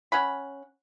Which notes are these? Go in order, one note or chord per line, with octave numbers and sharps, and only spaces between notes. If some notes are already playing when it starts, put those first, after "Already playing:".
C#4 F#5 B5